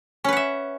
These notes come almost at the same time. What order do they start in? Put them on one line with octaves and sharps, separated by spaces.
C#4 B4 F#5 E5